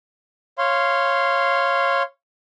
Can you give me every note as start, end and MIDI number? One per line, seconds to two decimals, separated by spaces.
0.58 2.03 73
0.58 2.03 77
0.58 2.03 84